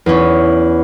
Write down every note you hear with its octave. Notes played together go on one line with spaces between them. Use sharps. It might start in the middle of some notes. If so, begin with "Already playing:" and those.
E2 C#4